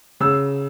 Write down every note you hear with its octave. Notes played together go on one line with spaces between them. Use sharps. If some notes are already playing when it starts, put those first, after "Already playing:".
C#3 E6